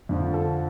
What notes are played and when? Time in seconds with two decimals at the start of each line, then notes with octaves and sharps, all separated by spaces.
0.09 F2 D3 F3
0.34 A4